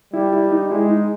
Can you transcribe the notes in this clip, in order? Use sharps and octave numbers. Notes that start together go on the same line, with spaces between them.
G3 E4
E4
D#4
G#3 E4
D#4